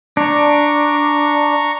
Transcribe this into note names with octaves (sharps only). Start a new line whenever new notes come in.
D4 A#5 C#6